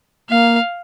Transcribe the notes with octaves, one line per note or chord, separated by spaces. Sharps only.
A#3 F5